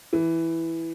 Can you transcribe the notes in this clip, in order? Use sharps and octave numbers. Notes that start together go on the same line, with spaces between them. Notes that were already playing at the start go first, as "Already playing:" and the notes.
E3